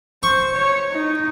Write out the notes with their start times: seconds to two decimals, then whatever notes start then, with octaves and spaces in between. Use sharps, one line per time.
0.23 C5 C#6
0.53 C#5
0.92 D#4